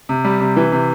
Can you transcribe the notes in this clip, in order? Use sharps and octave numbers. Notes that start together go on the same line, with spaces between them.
C3
G3
C3
E3
C3